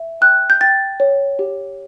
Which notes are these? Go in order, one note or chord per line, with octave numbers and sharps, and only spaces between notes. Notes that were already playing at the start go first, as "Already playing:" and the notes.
Already playing: E5
G5 F#6
G6
G5 A6
C#5
G4